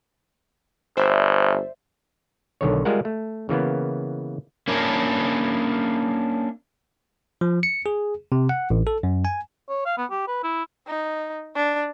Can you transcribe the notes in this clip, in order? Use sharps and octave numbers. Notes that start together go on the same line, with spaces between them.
G1 C5 D5 E5
B1 D3 D#3 C#5
G3 G#3 F4 A#4 F#5
A3
C#3 E3 A#3 B3
A#3 C#4 D4 E4 A#4
F3
C#7
G#4
C3
F#5
A1
A4
F#2
G#5
C#5
F5
B3
G4
B4
E4
D#4
D4